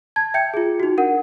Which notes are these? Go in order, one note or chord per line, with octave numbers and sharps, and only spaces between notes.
A5 G#6
E5 G5 G6 C#7
F4 G#4
D#4 F#4
D4 A#4 F#5